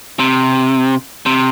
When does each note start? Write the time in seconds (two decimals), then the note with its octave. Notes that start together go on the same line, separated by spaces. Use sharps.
0.19 C3
1.26 C3